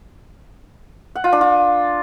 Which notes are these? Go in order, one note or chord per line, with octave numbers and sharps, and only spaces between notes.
F#5
F4
D4
F4